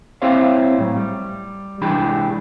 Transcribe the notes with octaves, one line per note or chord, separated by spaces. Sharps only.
C4 E4 G4 C5 C#5 F5
A2 F#3
G3
C2 E3 G#3 D4 G4 B5